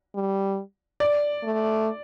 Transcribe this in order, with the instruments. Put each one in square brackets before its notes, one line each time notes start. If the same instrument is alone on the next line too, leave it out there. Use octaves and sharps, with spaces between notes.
[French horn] G3
[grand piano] D5
[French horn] A3